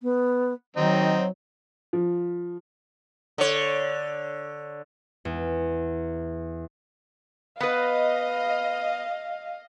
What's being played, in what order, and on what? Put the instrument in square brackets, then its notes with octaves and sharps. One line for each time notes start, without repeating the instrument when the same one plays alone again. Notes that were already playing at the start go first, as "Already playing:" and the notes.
[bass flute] B3
[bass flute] D#3 [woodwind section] F#3 [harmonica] C4 D#4
[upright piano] F3
[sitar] D3 C#5
[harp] E2
[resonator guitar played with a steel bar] B3 B4 [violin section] D#5 [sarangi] F5